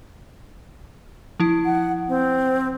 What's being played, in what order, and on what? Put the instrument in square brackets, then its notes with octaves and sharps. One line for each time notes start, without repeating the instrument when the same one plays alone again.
[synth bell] F3 E4
[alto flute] F#5
C4